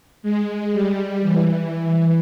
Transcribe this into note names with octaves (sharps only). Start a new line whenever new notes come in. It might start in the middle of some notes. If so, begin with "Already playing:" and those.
G#3
G3
E3